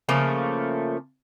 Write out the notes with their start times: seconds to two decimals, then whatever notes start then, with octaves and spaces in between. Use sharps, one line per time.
0.09 C#3 F3 A3 A#3